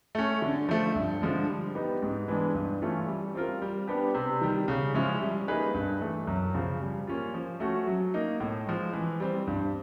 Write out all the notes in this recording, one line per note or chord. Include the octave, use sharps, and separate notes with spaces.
A3 C#4
D3
F3 A3
G2
D3 F3 G#3
G3
B3 D#4 G4
G#2
E3 G#3 B3 D4
G2
E3 A3 C#4 F4
G3
C4 F4 A#4
G3
B3 D4 G4
C3
D#3 G3
C#3
F3 G#3 C#4 E4
G3
A#3 D#4 G#4 B4
G2
E3 A3
F#2
C#3 F3
G3
A#3 C#4 F4
F3
A3 C#4 F#4
F#3
A#3 D#4
A2
F3 G#3
E3
G3 C4
G2